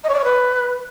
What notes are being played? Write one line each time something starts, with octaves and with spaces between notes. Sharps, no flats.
D#5
C#5
D5
C#5
B4